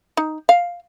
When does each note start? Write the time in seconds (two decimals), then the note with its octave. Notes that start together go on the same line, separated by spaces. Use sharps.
0.17 D#4
0.49 F5